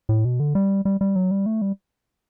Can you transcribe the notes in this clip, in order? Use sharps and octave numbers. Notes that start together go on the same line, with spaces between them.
A2
B2
D3
G3
G3
G3
F#3
G3
A3
G3